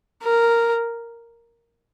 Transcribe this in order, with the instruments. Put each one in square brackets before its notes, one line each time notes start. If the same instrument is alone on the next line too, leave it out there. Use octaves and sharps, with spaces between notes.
[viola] A#4